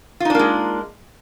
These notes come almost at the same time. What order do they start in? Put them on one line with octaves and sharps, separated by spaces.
F4 D#4 D4 A#3 G#3